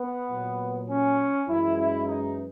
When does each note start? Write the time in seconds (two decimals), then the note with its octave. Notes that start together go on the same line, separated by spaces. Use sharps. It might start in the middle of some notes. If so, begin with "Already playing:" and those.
Already playing: B3
0.30 A#2 F#3
0.89 C#4
1.48 F#2 E3 G#3 E4
1.77 E4
2.07 D#4